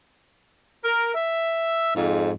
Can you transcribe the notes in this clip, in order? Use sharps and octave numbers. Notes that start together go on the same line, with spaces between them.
A#4
E5
F2 G#2